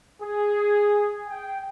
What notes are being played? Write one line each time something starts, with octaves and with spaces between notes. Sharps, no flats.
G#4
G5